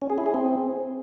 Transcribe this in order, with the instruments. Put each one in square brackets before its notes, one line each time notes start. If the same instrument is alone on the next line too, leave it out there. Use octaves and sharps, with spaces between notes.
[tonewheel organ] C#4
G#4
E4
G#4
C4